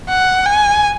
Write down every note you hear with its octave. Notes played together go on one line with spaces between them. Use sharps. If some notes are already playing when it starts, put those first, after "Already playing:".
F#5
G#5